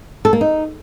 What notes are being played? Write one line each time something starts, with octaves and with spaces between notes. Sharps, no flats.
A4
A#3
D#4